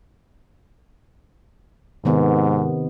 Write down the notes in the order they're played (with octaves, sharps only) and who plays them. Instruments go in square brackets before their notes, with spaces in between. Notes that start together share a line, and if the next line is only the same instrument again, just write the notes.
[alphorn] G#2 [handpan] C3 D#3 B3